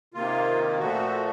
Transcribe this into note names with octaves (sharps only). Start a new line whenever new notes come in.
C3 D#3 A#3 F4
A#2 F3 A3 F#4